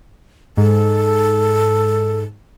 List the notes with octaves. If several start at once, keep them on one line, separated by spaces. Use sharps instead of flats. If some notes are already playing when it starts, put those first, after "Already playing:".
G#2 A4